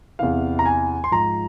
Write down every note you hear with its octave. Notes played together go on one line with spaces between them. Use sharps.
E2 C3 E3 F5
A#5
G#5
C6
G#2 F3 A#5